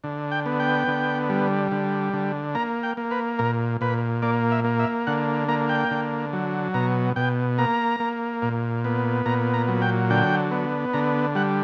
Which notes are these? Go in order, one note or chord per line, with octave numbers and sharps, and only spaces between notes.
D3
G5
B3
G5
D3
G3
D3
D3
A#3 A#5
G5
A#3
B4
A#2 A#4
A#2 B4
A#3 D5
E5
A#3
E5
D3 F#5
A#3 A#5
G5
D3
F#3
B2 A#5
B2 G5
A#3 A#5
A#3
A#2
B3
A#2 A#5
A#5
F#3
G5
D3 G5
B3
D3 A#5
G3 F#5